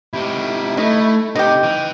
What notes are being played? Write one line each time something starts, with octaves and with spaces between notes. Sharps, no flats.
C3 D#4 E4
A3 D#4
C3 D#4 G4
E3